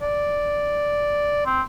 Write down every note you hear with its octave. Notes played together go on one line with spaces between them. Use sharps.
D5
C4